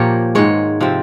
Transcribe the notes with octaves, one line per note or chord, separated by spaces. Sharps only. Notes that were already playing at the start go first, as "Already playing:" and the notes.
Already playing: A#2 F3 A#3 F4 G4 A#4 C#5
G#2 D#3 G#3 C#5
C3 F3 C4